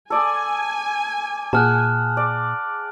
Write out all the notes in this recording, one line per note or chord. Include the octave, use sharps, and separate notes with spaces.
A4 D5 G#5 D#6
A#2 G#4 F#5 A5 F6 F#6
D5